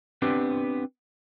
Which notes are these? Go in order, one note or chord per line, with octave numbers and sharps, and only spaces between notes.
B3 C4 D4 G4 B4